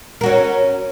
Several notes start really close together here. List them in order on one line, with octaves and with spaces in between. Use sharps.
A#4 F#4 C#4